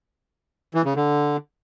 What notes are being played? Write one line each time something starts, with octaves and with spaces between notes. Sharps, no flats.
E3
C#3
D3